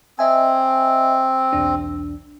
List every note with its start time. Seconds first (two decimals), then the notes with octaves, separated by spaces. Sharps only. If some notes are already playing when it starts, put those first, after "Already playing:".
0.19 C4 D#5 E5 G#5
1.53 B1 E2 D4